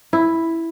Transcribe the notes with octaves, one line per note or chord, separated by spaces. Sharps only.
E4